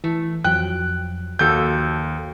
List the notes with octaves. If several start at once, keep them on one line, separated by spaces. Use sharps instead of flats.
E3 A3
F2 F3 F#3 G5 F#6
D#2 F3 F#4 A4 A5 G6